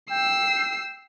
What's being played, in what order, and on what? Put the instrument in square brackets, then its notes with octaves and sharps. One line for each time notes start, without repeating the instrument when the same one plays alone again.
[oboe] G5 [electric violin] E6 C7